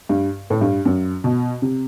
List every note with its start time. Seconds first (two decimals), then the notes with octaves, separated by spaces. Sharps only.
0.09 G2
0.50 A2
0.61 G2
0.85 F#2
1.24 B2
1.62 C3